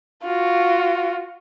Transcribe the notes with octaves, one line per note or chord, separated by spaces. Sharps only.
F4 F#4